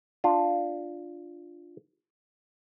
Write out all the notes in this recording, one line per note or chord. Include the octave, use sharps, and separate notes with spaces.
D4 F4